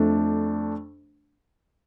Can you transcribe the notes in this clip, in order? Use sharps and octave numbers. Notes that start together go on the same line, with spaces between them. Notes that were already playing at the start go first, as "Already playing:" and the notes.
Already playing: F2 A3 D4